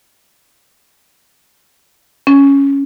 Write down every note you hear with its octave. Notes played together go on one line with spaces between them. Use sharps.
C#4